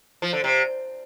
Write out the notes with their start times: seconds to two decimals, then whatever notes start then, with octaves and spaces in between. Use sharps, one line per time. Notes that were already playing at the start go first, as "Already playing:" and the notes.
0.22 F3
0.33 D3
0.44 C3